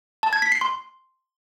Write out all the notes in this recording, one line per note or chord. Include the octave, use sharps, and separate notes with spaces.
A5
G#6
B6
C7
C6